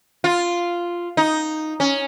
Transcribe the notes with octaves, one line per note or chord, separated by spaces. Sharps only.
F4
D#4
C#4